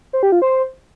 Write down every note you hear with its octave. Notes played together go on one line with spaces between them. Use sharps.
C5
G4
F4
C5